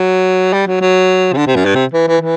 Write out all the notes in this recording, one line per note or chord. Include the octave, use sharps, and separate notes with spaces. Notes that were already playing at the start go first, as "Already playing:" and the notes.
Already playing: F#3
G3
F#3
F#3
C3
D3
C3
F#2
G2
C3
E3
E3
E3